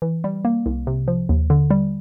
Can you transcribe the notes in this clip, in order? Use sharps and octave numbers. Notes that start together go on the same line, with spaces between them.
E3
G3
A#3
C2
C3
F3
D#2
D3
G3